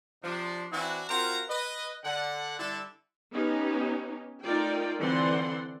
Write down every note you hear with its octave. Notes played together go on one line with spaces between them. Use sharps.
C3 F3 D4
E3 C4 D4 E4 F#4
C4 F4 F#4 A#4 F5 A#5
B4 D#5
D3 F#5
D3 G3 D4 E4 A4
B3 C#4 D#4 G4
A3 D#4 F4 A#4 D5 G5
D3 E3 C4 D5 F#5 C6